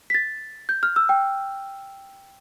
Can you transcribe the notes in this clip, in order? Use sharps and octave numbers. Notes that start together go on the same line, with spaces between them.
B6
A6
G6
F6
E6
G5